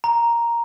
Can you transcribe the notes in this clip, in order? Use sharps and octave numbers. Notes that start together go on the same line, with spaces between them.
A#5